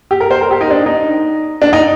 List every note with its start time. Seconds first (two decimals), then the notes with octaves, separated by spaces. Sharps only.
0.11 G4
0.21 A#4
0.31 C5
0.41 A#4
0.51 G4
0.61 D#4
0.71 D4
0.86 D#4
1.62 D4
1.73 D#4